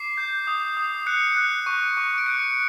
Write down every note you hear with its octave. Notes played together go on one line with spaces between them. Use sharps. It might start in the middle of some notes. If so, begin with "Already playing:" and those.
Already playing: D6 C7
G6
D#6
D#6
F#6 C#7
F#6
C#6
C#6
D7
F#6 C#7